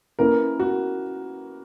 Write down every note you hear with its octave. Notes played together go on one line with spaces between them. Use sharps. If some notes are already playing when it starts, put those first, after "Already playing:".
A#3 C#4 E4 A#4 B4
F#4